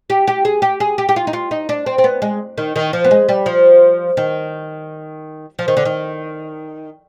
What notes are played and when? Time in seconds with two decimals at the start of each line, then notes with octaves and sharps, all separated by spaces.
0.10 G4
0.27 G4
0.45 G#4
0.62 G4
0.80 G#4
0.98 G4
1.09 G4
1.16 F4
1.27 D#4
1.33 F4
1.51 D#4
1.69 D4
1.86 C4
1.98 C4
2.04 B3
2.22 G#3
2.58 D#3
2.76 D#3
2.93 F3
3.04 B3
3.11 G#3
3.29 G3
3.46 F3
4.17 D#3
5.59 F3
5.68 D#3
5.77 D3
5.85 D#3